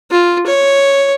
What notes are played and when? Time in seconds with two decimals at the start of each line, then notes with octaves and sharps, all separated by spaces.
0.11 F4
0.46 C#5